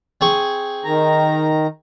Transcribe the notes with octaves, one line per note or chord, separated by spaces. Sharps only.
C4 G#4 C#6
D#3 A#5